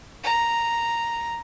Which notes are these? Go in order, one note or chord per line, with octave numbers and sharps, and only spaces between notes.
A#5